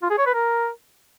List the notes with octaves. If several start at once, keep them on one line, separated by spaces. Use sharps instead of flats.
F4
G#4
C#5
B4
A#4